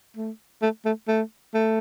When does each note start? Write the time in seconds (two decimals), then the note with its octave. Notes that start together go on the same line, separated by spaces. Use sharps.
0.17 A3
0.62 A3
0.85 A3
1.08 A3
1.54 A3